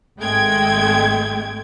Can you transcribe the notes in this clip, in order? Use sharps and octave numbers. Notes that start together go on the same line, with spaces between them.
G#1 G#3 A3 G5 G#6